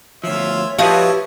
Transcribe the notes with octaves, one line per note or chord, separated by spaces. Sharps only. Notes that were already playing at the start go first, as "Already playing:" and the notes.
D2 F3 F4 C#5 E5
F3 E4 F#4 G4 B4 C#5 D#5 F5